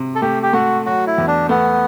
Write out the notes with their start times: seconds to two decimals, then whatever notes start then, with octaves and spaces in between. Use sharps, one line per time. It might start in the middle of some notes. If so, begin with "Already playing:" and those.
Already playing: C3
0.15 A4
0.22 A3 G4
0.43 G4
0.53 A3 F#4
0.86 F#3 F#4
1.07 E4
1.18 E2
1.28 D4
1.49 A3 B3